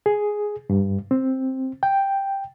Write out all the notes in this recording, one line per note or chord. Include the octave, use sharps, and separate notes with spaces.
G#4
G2
C4
G5